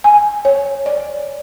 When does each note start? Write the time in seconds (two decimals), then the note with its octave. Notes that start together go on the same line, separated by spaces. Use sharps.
0.04 G#5
0.45 C#5
0.86 D5